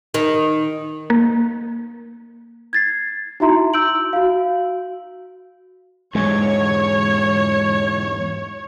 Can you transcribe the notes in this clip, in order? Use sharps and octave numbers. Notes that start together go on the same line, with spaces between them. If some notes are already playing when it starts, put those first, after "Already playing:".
D#3
A#3
G#6 A6 C7
D#4 E4 F#4 E5 A#5 C6
E6 G6 D7 F#7
F#4 F5
E2 G#2 G#3 C#5